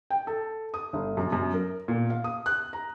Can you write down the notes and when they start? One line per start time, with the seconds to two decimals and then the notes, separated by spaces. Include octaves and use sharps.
0.10 G5
0.27 A4
0.74 D#6
0.93 G1
1.17 F#2
1.32 F#2
1.54 A#4
1.88 A#2
2.10 F5
2.24 D#6
2.46 F#6
2.73 A#5